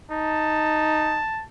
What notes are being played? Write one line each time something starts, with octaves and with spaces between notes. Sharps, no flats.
D#4 A5